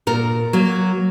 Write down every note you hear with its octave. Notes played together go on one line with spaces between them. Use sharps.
A#2 A#4
F#3 A#3